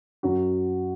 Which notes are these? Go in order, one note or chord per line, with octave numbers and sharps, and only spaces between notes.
F#2 F#3 C#4 F#4